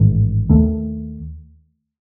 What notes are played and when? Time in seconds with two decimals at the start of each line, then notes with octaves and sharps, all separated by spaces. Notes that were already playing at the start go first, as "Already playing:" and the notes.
Already playing: A1 G#2 D#3
0.49 D#2 D#3 A3